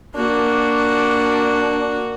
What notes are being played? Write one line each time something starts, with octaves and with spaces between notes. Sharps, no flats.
A#3 D4 F#4